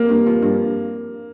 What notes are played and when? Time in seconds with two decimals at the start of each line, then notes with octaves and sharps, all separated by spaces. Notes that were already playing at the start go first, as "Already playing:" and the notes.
Already playing: G3 A#3 C4
0.09 G2
0.26 F3
0.42 G2